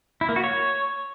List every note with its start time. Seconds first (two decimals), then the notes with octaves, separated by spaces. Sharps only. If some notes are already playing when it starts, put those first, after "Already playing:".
0.21 E4
0.29 A#3
0.36 F#4
0.44 C#5